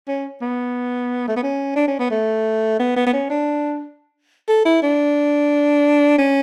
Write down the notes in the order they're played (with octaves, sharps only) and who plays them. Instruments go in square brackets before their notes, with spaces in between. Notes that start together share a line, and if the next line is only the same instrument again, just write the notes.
[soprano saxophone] C#4
B3
A3
B3
C#4
D4
C#4
B3
A3
B3
B3
B3
C#4
D4
A4
E4
D4
C#4